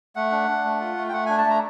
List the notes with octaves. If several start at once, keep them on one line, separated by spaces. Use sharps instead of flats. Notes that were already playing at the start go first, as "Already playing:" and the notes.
A3 F#5
D4
D4
A3
F4
A3
G5
A3 F#5
D4 G#5
A5
A3 A#5